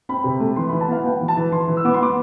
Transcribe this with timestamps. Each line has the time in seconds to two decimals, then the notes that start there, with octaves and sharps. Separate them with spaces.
0.09 C4 B5
0.24 C3
0.40 A3
0.56 E3 C6
0.69 B5
0.73 E3
0.81 A5
0.88 B3 F5
1.04 B3 G5
1.21 E3
1.28 A5
1.37 E3
1.52 E3 C6
1.68 E3
1.77 E6
1.85 B3 D6
1.94 C6
2.01 B3 D6